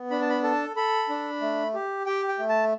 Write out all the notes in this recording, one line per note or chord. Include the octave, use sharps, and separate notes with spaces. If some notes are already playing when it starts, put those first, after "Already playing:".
Already playing: B3
D4 B5
A5
B5
A4 A5
A4 B5
D4
A3
G4
G4 G5
G5
A3
A5